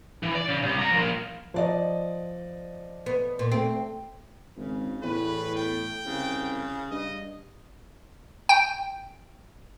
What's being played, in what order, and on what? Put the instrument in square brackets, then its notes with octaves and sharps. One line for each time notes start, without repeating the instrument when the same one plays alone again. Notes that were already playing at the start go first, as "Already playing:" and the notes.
[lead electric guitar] E3
D5
C#3
C2
D5 A#5
F3 A#3
[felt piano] F3 D5 D#5
[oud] B3
A#2
[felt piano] A3 [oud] C4
[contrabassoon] G#1 [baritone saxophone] C#3
[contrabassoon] E2 [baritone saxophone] A2 [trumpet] B4
[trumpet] G5
[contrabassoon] C2 [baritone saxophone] C#3
[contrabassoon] G2 [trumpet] D#5
[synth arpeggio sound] G5